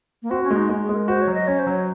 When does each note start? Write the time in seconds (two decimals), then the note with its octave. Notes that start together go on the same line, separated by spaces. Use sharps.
0.22 A#3
0.30 C4 F#4
0.43 C#4
0.50 G#3
0.56 D#4
0.69 G#3
0.82 G#4
0.89 G#3
0.95 A#4
1.08 F#4 C5
1.22 C#5
1.27 F#3
1.34 D#5
1.47 C#4 C#5
1.59 C5
1.67 F#3 C#5